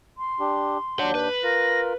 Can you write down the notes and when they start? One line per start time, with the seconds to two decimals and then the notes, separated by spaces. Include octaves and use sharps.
0.17 C6
0.40 D4 G4
0.99 D#2 D4 C#5 F#5 G6
1.15 B4
1.44 F4 A#4 A#6